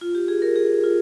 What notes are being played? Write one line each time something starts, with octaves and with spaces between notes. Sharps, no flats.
F4
G4
G#4
A#4
G#4
F4